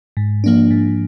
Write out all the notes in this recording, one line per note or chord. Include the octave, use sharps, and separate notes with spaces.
G#2
F3 A#3 D4
G#2